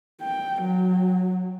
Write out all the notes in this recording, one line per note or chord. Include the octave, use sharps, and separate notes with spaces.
G5
F#3